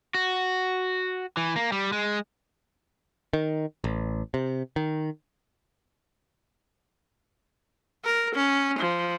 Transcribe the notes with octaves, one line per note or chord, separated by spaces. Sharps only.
F#4
E3
A#3
G3
G#3
D#3
A1
C3
D#3
A#4
C#4
F3